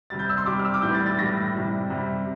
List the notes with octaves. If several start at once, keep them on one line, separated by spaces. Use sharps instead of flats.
C3 G3 A6
G6
E6
C6
C3 G3 D6
F6
E6
D6
A2 E3 G3 G6
A6
A6
A2 E3 G3 A#6
C3 G3
C3 G3